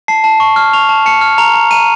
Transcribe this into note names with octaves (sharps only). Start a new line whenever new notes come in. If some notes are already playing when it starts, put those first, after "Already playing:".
A5 C7
A5
C#6
F6
C#6 F7
A5
A5 C#7
F6
A#5 F7
A#5
A#5 D#7